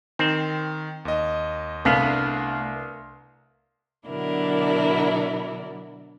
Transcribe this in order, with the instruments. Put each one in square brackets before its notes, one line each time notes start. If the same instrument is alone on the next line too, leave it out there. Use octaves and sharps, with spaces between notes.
[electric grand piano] D#3 [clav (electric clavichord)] C4
[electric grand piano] D#2 D#5
[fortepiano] C2 F5 [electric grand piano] A3 D4 [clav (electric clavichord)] B3
[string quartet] B2 D3 F#3 D4 E4 A#4